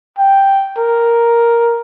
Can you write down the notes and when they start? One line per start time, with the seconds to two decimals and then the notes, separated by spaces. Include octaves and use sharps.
0.19 G5
0.78 A#4